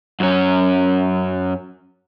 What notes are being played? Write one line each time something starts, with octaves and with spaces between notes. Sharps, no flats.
F#2 C#4